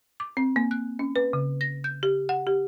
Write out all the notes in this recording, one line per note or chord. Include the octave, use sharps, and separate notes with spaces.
D6
C4
A#3
F#6
C#4
B4
C#3
A#6
G6
G4
F#5
G4